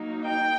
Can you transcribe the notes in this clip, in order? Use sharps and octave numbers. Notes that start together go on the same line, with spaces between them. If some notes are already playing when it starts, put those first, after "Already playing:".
Already playing: F#3 A#3 D#4
G5